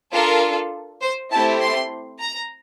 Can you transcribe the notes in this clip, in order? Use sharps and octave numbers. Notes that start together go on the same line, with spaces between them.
D4 F4 A4 A#4
C5
A3 C4 E4 G4 A5
C6
A#5